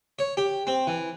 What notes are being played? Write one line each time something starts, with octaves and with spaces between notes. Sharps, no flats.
C#5
G4
C4
E3